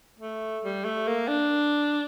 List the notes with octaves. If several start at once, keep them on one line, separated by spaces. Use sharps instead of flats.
A3
G3
A3
A#3
D4